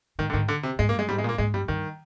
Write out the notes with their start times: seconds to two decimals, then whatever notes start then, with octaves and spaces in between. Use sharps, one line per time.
0.19 G#2 D#3
0.30 D3
0.33 G#2 D#3
0.48 D3
0.63 C3
0.79 G#2 G#3
0.89 A#3
0.93 G2
0.99 G#3
1.09 G#2 G3
1.18 G#3
1.24 A#2 A#3
1.38 G#2 G#3
1.53 G2 G3
1.68 G2 D#3